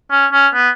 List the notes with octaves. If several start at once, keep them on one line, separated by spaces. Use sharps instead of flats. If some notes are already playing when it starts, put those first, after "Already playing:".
C#4
C#4
B3